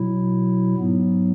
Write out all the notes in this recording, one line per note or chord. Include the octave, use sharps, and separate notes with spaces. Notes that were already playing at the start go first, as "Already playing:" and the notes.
Already playing: B2 F#3 E4
G#2 F#3 B3